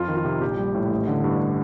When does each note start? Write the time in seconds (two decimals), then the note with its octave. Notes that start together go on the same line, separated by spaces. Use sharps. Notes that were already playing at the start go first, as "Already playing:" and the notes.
Already playing: F2 F4
0.08 D#3
0.17 F4
0.25 C3
0.41 A#1 G4
0.58 G3
0.75 A2
0.91 A1
1.07 D3
1.24 G2